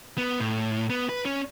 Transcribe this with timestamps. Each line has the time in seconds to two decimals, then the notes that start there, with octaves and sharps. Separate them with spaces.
0.18 B3
0.40 A2
0.90 B3
1.09 B4
1.25 C#4